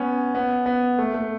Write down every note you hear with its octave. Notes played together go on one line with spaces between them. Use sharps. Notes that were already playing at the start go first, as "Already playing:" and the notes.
Already playing: B3 C#4
B3
B3
A3
A3